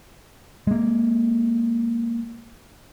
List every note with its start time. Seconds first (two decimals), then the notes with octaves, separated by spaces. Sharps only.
0.67 G#3 A#3